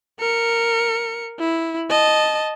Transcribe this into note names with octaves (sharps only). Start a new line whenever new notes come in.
A#4 C#7
E4
D#5 A5